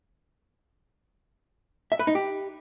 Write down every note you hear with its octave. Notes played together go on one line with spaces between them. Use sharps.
E5
B4
D#4
G4